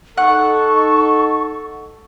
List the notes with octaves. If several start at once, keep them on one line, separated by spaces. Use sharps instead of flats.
D#4 A4 F#5 C#6